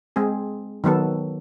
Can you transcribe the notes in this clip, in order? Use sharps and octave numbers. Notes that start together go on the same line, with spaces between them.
G#3 C4 G#4
D#3 F#3 B3 A4